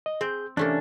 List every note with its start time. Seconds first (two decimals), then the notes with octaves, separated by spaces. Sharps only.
0.06 D#5
0.21 C4 G#4 G6
0.57 C3 E3 A3 A#3 C#4 D4